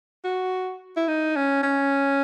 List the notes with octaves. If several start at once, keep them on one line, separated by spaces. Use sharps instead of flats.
F#4
E4
D#4
C#4
C#4